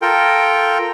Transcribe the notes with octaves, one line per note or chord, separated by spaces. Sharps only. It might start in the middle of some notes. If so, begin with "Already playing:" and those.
F4 A4 A#4 G5